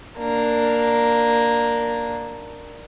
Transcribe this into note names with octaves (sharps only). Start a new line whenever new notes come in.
A#3 D4